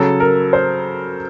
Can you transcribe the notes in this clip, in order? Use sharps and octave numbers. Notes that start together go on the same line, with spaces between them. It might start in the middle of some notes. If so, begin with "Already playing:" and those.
Already playing: C#3 F#3 A4
A#4
C5